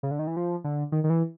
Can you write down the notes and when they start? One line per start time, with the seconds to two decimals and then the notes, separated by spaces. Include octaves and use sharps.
0.03 C#3
0.11 D3
0.19 D#3
0.27 E3
0.37 F3
0.64 D3
0.92 D#3
1.04 D#3
1.10 E3